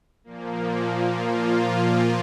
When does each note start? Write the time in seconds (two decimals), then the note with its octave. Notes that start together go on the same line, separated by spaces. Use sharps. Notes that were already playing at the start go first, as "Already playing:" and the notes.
0.24 A#2 F3 A#3
1.08 F4